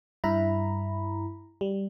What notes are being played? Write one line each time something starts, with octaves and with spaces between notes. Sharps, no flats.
G2 E4 A#5 B5
G3